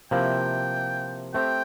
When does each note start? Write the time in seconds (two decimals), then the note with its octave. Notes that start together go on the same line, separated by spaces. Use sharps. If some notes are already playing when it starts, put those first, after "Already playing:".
0.11 C3 F3 A#3 E4 G5
1.34 A3 C4 G4 G5